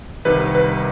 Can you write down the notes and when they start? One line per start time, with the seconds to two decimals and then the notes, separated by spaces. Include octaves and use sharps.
0.25 C2 C3 D#3 G3 B4
0.55 B4